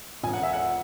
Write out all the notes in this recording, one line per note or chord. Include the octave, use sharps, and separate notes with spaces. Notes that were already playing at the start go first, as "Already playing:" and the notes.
E1 G#5
F#5
E5
F#5